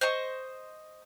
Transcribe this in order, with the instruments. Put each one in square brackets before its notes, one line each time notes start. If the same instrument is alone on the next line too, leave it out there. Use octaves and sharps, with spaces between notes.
[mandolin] C5 D#5 C#6